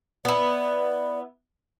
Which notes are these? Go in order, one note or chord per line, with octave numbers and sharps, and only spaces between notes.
B3 E4 D5